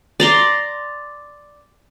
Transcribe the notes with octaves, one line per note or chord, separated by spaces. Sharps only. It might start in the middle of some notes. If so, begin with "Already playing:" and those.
D5 A#5 C6